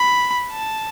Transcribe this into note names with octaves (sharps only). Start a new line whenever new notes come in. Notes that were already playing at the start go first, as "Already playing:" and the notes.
Already playing: B5
A5